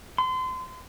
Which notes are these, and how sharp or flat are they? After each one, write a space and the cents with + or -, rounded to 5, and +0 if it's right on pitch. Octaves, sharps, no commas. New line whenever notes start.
C6 -30